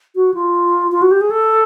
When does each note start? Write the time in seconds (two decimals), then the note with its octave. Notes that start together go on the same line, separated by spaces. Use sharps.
0.16 F#4
0.34 F4
0.92 F4
1.02 F#4
1.11 G4
1.21 G#4
1.30 A4